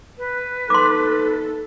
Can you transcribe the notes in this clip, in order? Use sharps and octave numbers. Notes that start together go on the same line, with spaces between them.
B4
D#4 A4 C6 D6